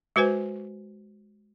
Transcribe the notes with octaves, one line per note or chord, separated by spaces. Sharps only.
G#3 F#4 B4 C5 G#5